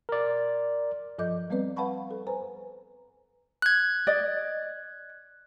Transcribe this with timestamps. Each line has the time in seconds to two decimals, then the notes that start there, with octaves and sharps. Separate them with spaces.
0.09 A#4 D5
1.18 G2 F3 A4 D#5 D6 G6
1.50 G3 B3 C4 B4 D5
1.77 B4 F5 F#5 A5 B5 C#6
2.11 A4
2.27 B4 C5 G#5 A#5
3.62 F#6 G#6
4.07 D5 D#5